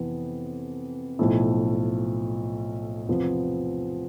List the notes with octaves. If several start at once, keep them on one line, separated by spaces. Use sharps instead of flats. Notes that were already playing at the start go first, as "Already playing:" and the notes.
Already playing: F2 C3 E3 B3
B1 A2 F3 A3 E4
E2 C3 F3 B3